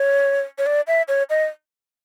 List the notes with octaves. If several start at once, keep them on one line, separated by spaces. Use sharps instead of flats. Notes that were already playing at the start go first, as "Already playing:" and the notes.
Already playing: C#5
C#5
D5
E5
C#5
D#5